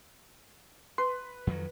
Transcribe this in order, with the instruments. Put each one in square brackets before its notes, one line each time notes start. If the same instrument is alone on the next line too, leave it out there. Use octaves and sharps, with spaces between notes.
[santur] B4 [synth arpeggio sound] C6
[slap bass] F2 D#3 F#3